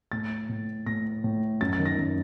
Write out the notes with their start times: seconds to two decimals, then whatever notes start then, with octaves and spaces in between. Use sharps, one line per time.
0.12 A2 A6
0.49 A2
0.86 A2 A#6
1.24 A2
1.61 F#2 A6
1.73 A6
1.79 D#3
1.85 A#6
1.97 F#2